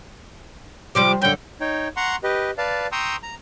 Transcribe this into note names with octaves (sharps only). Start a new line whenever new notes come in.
C3 F3 G3 D6
F#2 D3 G5
D#4 C#5 G5
F#5 A#5 C6 C#6
G4 B4 D#5
B4 D5 F5 A5
G5 A#5 C6 C#6 D#6 E6
A#5